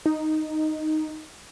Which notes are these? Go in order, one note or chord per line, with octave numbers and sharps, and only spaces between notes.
D#4